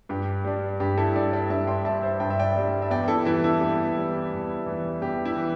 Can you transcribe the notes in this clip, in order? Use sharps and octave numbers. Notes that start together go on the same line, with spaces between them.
G2 G4
G3 D4
G2 G4
E4 A4
G3 D4 A4 D5
D5 G5
G2 E5 A5
G5 C6
G3 D4 E5 A5
C5 E5
G2 G5
E5
D5 G5
G3 D4
E5
E2 D5 G5
E4 A4
E3 G3 E4 A4
E4
E2 G4
E3 G3
E2
E3 G3
E2 G4
E4
E3